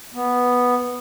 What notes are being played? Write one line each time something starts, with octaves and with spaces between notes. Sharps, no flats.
B3